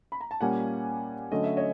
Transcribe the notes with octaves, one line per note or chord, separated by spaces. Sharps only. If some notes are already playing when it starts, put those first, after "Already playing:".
B5
A#5
A5
A#2 G3 A#3 C#4 F#5 G#5
D3 F#3 A3 C#4 D#5
E5
C#5 D#5